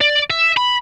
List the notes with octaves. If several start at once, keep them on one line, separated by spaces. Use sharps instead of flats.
D5
E5
B5